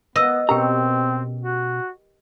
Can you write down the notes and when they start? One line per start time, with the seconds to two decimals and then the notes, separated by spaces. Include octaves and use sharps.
0.16 B3 B4 D#5 E6
0.49 B2 C4 C#4 G4 A#4 G5 A#5
1.41 F#4